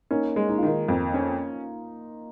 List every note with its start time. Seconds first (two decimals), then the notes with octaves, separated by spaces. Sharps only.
0.11 A#3 C#4 D#4
0.36 G#3
0.49 D#4
0.58 F4
0.63 D#3 A#3 D#4
0.88 F2
1.14 C#4